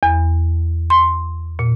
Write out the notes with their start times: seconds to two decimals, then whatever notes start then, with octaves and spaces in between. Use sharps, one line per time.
0.03 E2
0.90 C6
1.59 A#2